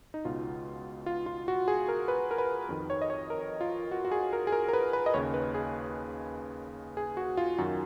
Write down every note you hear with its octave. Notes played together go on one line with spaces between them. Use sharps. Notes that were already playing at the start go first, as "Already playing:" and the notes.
D#4
C#2 B2 F4
F4
F4
F#4
G#4
A#4
B4
A#4
B4
F2 D#3
C#5
D#5
C#5
A#4
F4
F#4
F#4
G#4
A#4
G#4
A#4
A#4
B4
B4
D#5
D#2 C#3 C#5
B4
G#4
G#4
F#4
F4
F#2 D#3 F#4